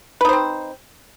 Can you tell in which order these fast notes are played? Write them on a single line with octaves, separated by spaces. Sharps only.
B4 D#4 C5 C4